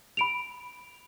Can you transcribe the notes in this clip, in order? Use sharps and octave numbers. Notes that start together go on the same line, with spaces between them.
B5 D7 F7